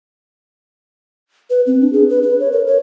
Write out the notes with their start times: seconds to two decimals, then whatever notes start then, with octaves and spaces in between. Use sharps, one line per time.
1.50 B4
1.67 C4
1.81 D4
1.93 G#4
2.09 B4
2.23 B4
2.40 C#5
2.52 A#4
2.67 C#5